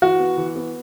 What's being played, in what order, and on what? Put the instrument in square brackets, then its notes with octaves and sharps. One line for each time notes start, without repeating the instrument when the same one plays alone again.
[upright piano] E3 F#4
B3
E3
B3